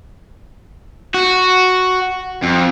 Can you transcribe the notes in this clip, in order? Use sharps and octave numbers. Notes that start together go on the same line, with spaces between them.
F#4
F2